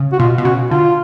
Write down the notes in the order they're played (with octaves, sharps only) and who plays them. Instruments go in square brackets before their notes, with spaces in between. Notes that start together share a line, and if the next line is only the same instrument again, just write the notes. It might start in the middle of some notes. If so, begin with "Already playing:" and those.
Already playing: [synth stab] C#3
[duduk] F#4
[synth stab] B2 [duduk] F4
[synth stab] B2
[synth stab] C#3 [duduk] F#4
[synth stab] D3 [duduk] F4